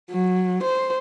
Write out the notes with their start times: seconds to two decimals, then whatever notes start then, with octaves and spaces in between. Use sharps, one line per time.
0.11 F#3
0.63 C5